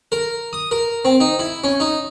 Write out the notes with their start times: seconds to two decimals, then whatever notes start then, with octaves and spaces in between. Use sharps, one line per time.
0.12 A#4
0.53 D#6
0.71 A#4
1.05 C4
1.20 D#4
1.39 E4
1.64 C#4
1.80 D#4